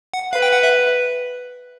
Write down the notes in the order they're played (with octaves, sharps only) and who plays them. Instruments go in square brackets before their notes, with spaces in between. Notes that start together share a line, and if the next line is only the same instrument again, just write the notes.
[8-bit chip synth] F#5
[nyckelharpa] B4 [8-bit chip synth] F5
[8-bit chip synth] G5
F#5
E5